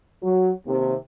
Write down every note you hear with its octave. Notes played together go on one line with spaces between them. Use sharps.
F#3
D#2 C3